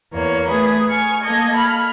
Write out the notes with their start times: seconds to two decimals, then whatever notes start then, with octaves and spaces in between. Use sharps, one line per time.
0.12 E2 A#3 C#5
0.48 A3 G#4 B4
0.87 G#5 C#6 F6
1.24 A#3 A4 D#5 G#6
1.56 B5 F6